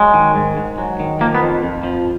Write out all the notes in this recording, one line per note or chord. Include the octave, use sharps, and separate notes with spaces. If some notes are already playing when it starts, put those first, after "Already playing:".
Already playing: F#3 G#3
D#3
G#2
G#2
F#3
D#3
F3 A#3
B3
F2
F2
F3